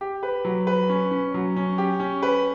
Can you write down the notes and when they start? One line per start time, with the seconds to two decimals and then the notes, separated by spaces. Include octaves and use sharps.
0.01 G4
0.23 B4
0.45 F#3
0.67 B4
0.89 C#4
1.11 C#4
1.34 F#3
1.56 C#4
1.78 G4
2.00 C#4
2.23 B4